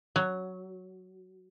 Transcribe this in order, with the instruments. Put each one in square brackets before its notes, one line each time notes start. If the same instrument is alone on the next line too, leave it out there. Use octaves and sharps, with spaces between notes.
[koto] F#3